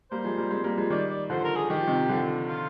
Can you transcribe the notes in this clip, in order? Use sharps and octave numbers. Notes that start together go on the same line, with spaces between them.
G3 A#3 C5
F3 G#3
G3 A#3
G#3 C4
G3 A#3
F3 G#3
D#3 G3 D5
D5
D3 F3 C5
A#4
G#4
D#3 G4
F3
C3 D#3
D3 F3
F4